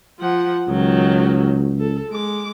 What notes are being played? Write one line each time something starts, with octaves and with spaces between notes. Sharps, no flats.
F3 F#5
C#2 D#3 F#3
A4
G#3 D6